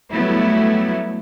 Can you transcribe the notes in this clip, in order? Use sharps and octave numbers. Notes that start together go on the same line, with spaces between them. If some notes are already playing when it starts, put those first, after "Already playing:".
F#3 G3 A3 B3 E4